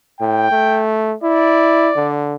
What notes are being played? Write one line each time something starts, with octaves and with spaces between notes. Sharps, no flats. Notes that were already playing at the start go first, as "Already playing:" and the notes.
A2 G5
A3
E4 D5
D3